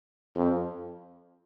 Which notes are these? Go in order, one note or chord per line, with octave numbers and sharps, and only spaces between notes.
F2